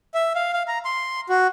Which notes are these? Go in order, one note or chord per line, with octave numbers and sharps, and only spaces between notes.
E5
F5
F5
A#5
C6
F#4